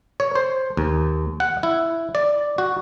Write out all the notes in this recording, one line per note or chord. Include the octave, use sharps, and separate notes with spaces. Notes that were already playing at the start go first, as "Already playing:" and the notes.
C#5
C5
D#2
F#5
E4
D5
F#4